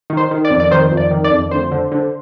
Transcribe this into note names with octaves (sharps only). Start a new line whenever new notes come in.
D#3
C5
D#3
D5
F2
D5
D#3 C5
F2
D5
D#3
D5
F2
D2 C5
D3
D3